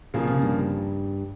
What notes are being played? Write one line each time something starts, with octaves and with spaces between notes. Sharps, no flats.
A#2 C#3 F3 A#3 F4 G#4
C3
G2